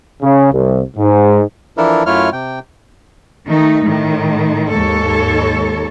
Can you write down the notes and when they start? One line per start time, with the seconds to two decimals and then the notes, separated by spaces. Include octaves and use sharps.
0.22 C#3
0.53 C2
0.97 G#2
1.77 E3 F3 D4 E4 A4 A#4
2.06 F#2 A3 E4 F4 C#5 F6
2.33 C3 G5
3.46 D#3 A3 D#4
3.85 A2 D#3
4.69 D#2 G#2 A4 C#5